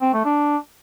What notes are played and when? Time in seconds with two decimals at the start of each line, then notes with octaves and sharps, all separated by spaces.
0.01 C4
0.13 A3
0.25 D4